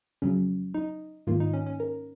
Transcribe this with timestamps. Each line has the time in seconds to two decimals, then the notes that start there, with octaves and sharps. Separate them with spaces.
0.22 F2 C#3 F#3 C#4
0.74 D#4
1.27 G#2 D#3 A#3 F4
1.40 D#4
1.54 C#4
1.67 C#4
1.80 A#4